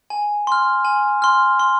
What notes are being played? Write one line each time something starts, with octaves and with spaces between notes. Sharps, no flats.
G#5
C6 F6
G#5
C6 F6
C6